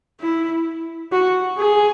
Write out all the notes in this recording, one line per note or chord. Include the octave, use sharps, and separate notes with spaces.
E4
F#4
G#4